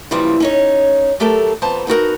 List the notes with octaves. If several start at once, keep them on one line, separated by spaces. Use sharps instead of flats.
A#2 C#3 E3 F3 G3
C#4 D#4 C#5
F#3 A3 G4 A4 A#4
F2 B3 C5 A5 A#5
B3 D#4 F#4 A#4